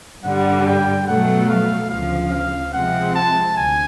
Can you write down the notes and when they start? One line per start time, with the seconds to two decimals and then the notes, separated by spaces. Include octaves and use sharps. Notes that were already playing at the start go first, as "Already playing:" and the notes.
0.24 G2 D3 G3 F#5
0.66 G5
1.07 B2 F#3 A3 F#5
1.49 F5
1.90 D2 C#3 F3 F5
2.33 F5
2.73 C3 F3 G#3 C4 F#5
3.15 A5
3.57 D2 G#5